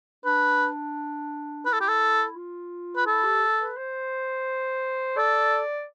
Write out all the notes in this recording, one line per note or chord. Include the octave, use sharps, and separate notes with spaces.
D4 B4
E4 B4
A4
G4
A4
F4
B4
E4 A4
G4
B4
C5
A4 D5